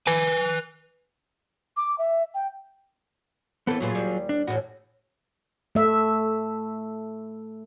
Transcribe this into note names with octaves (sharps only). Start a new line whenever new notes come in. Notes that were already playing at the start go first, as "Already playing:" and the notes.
B4 G#5
D6
E5
G5
D#2 E3 B3 C4 A4
E2 A#2 E3 F#3 F4 G#4
D#2 G3
D4
E2 A2 F#4
A3 E5